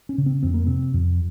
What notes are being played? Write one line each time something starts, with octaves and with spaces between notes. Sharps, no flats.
C#4
C#3
C4
F2 C4
A#3
C3 C4
F2